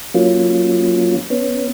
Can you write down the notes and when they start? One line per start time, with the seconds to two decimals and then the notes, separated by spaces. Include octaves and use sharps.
0.14 F#3 A#3 C#4 F4
1.30 B3 C#4